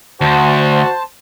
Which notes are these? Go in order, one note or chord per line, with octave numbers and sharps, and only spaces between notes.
D2 F#4 C5 A5